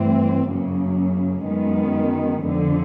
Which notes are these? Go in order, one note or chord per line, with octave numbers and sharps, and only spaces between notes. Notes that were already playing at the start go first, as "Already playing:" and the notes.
Already playing: G2 E3 A3 C4
F#2 C#3 F#3 A#3
F#2 D#3 G#3 B3
F2 D3 F3